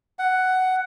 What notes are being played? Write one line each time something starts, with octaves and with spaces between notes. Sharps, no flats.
F#5